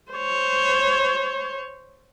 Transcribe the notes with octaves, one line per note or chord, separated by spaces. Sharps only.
C5 C#5